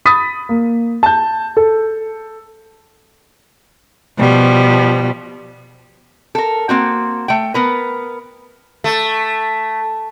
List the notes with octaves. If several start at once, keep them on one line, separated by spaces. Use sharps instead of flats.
B5 D#6 A6 B6
A#3
A5 G6
A4
B2 F3 G3
A4 A#4
A#3 C4 F#4
A3 G5
B3 A#4 B4
A3